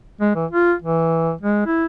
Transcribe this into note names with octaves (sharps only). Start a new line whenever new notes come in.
G#3
E3
F4
E3
G#3
E4